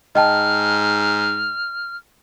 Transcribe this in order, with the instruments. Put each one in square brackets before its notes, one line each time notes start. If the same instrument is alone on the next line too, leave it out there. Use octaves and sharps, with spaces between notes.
[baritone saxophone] G#2 [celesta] D#5 G5 A5 [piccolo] F6